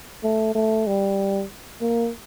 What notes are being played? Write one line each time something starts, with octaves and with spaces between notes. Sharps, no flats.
A3
A3
G3
A#3